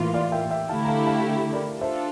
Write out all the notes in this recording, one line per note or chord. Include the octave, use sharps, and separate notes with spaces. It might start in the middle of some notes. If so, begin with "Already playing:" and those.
Already playing: A2 E3 A#3 F4
D5 F5
E5 G5
E5 G5
D3 A3 E4 G4 F5 A5
A#5
F5 A5
F5 A5
A#4 D5
D4 F4 A4 C5 E5